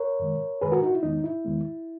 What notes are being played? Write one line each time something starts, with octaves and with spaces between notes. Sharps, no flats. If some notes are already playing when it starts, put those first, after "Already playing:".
Already playing: A#4 C#5
F#2 D#3 G#3
F#2 D#3 G#3 G#4 B4
F#4 A#4
D#4 F#4
E4
E2 D#3 G#3 B3 D#4
E4
E2 D#3 G#3 B3